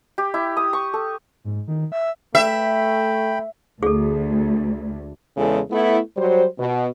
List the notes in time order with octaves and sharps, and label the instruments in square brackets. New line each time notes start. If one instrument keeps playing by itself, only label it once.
[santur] G4
E4
D#6
C#6
A4
[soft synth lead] G#2
D#3
E5
[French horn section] A3 [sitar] E5 [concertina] G5 B5
[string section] D2 [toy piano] G#4 A4
[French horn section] E2 C#3 G#3 E4 A4
A3 B3 E4
F#3 G3 C5
B2